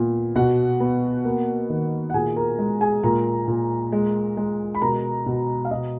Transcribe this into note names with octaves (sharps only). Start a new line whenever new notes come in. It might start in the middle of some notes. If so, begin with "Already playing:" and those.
Already playing: A#2 B3
B2 F#4 F#5
B3
A#3
D#3
F#5
A#2 G#4 G#5
A#4 A#5
G#3
G#4 G#5
A#2 A#4 A#5
A#2
G#3
G#3
B5
B2 A#4 A#5
B2
F5
B2 D#5